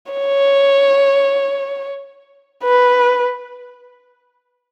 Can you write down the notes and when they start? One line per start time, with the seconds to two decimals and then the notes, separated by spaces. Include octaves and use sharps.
0.12 C#5
2.64 B4